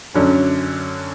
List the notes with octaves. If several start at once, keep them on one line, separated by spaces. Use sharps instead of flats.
F#2 D3 F#3 C#4